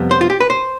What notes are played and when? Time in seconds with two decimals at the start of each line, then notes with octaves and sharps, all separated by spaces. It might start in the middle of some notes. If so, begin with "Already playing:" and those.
Already playing: F2 C3 G3 B3
0.11 C5
0.21 F4
0.30 G4
0.40 B4
0.50 C5